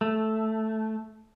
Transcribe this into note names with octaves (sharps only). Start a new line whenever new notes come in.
A3